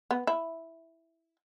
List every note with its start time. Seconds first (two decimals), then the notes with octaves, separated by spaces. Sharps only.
0.11 B3
0.27 E4